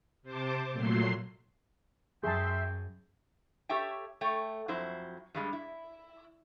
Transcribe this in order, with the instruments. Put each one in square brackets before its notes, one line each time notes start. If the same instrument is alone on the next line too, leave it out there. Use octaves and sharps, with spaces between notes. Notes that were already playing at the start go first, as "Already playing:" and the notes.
[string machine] C3 C5 A5 D6
A#2 F#3 A3 C6 C7
[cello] F#2 [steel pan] G#4 A5 [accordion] E5 C6 [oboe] G5
[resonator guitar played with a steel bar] G4 A4 C#5 E5 G5
A3 C#5 G5
F2 F#3 E4 C5
G2 G3 G#3
E4